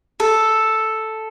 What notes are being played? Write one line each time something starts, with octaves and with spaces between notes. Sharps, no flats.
A4